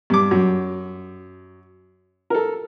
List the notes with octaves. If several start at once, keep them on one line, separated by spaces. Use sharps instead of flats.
G2 D6
F#2
A4 A#4